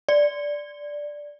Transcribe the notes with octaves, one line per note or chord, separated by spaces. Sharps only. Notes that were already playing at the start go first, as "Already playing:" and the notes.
D5